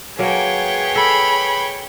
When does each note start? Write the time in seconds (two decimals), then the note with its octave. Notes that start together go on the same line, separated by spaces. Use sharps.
0.19 F#3 A#3 G#4 A#4 B4 C#5 G5
0.96 A4 B5